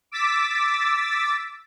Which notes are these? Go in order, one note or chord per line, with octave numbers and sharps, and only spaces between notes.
D6 E6 A6 B6